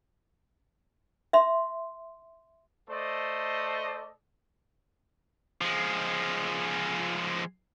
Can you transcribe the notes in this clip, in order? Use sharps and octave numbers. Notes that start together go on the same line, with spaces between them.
E5 C6
A3 A4 C5 D5 D#5
F3 G#3